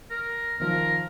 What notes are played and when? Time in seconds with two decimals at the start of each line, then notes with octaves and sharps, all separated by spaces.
0.11 A#4
0.60 D#3 F3 A#4